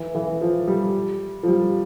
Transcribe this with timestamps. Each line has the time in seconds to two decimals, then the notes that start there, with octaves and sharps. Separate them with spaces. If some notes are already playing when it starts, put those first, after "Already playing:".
Already playing: E3
0.15 E3
0.41 F3
0.68 G3
1.43 F3
1.48 G3